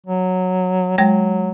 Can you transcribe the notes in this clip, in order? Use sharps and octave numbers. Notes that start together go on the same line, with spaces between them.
F#3
F#3 G#3 G5 A#6